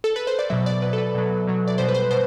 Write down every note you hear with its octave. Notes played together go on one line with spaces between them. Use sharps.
A4
B4
C5
D5
B2 F#3 E5
D5
B2 F#3 B4
A4
B4
B2 F#3
B2 F#3
D5
B2 G3 C5
B4
C5
B2 C5